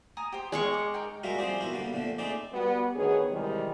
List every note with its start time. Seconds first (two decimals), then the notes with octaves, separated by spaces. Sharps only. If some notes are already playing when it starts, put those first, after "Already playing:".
0.17 G#5 A#5 D#6
0.32 G4 C5
0.52 G#3 G#4 D#5 F5 G#5 C#6
0.74 D6
0.94 D#4 A#4 G5
1.23 G3 G#3 F4 F#4 A#4 E5
1.38 F3 G3 C4 G#4 C5 D5
1.61 B3 E4 F#4 A#4
1.73 D3 G3 A#3 B3
1.93 A#2 D3 F3 A3
2.18 A3 C4 D#4 G#4 D5
2.52 G3 B3 F#4
2.95 D2 D#3 B3 G#4 B4 C#5
3.31 C3 D#3 E3 G3 G#3